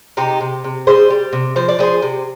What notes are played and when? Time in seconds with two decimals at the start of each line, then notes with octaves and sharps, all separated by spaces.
0.17 C3 D#4 G4
0.41 C3
0.64 C3
0.87 G3 G#4 C5
1.10 G3
1.33 C3
1.56 F3 C5
1.69 D5
1.79 F3 G#4 C5
2.02 C3